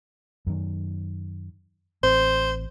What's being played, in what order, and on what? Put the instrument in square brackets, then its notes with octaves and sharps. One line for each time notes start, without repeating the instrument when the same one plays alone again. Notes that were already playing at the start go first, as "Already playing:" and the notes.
[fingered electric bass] F#2 D#3
[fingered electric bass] A1 C4 [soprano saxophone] C5